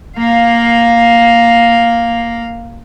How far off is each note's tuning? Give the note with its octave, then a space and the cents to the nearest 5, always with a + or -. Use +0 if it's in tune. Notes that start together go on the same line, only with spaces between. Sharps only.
A#3 +0 F5 +5